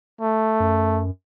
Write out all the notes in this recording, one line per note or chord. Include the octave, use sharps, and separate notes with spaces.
A3
F#2